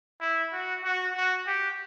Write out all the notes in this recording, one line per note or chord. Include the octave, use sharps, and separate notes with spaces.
E4
F#4
F#4
F#4
G4